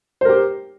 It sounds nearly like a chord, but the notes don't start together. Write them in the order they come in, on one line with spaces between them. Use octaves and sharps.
C5 A#4 G4